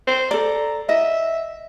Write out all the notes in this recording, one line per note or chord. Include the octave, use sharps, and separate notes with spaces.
C5
A4 D5 A#5
D#5 E5